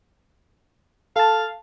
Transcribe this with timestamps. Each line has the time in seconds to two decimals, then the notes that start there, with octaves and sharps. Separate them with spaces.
1.16 A4 F5 A5